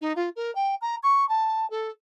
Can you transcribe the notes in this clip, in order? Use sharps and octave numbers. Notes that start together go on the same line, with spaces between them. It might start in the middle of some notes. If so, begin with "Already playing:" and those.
D#4
F4
A#4
G5
A#5
C#6
A5
A4